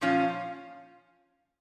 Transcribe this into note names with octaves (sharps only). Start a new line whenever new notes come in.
A#2 F3 C#4 F4